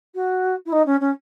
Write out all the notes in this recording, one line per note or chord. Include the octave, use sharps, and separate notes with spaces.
F#4
E4
D#4
C#4
C#4